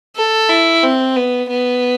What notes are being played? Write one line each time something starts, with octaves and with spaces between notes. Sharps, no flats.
A4
E4
C4
B3
B3